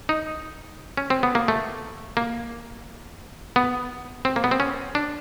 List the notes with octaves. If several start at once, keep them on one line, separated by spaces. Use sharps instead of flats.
D#4
C#4
C4
B3
A#3
A3
A#3
B3
C4
A#3
B3
C4
C#4
D4